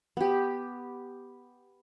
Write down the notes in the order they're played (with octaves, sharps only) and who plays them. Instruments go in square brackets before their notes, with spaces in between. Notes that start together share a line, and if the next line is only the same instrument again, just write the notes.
[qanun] B3 G4